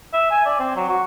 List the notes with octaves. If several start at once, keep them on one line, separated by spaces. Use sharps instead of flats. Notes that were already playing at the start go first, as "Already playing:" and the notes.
E5
G#5
D5
C4
F#3
F#4